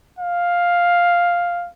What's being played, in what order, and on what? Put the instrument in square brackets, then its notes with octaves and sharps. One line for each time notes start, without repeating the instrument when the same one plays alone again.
[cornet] F5